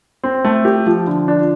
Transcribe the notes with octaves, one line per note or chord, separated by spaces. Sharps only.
C4
A3
G4
F3
D3
D4